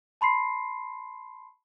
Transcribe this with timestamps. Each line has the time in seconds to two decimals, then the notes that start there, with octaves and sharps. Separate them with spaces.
0.21 A5 B5 C6 C7